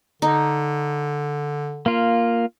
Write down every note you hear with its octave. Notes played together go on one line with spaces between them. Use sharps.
D3 D#4
A#3 F4